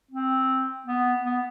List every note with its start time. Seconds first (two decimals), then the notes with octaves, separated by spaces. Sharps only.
0.11 C4
0.86 B3
1.25 B3